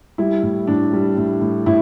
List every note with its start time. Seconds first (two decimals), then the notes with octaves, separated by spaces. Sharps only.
0.18 G3 E4
0.43 A2
0.67 A2 D4
0.93 G3
1.18 A2
1.41 A2
1.66 A2 E4